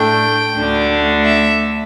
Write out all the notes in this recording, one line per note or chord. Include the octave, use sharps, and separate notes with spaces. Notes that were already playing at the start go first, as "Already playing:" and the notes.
Already playing: A2 A3 D4 G5
D2 D3 A3 D4
E5